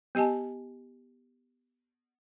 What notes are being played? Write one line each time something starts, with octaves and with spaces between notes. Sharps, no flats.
B3 G4 D#5 G#5 A5